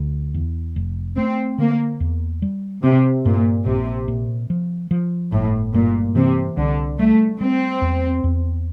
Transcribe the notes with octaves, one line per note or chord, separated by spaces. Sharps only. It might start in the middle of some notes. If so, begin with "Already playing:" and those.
Already playing: D2
E2
F1
A3 C4
D3 A#3
E2
G3
C3 C4
G2 A#2
A#1 C3
A#2
F3
F3
G1 A2
G2 A#2
C3 E3
C2 D3
G3 A3
G3 C4
E2
E2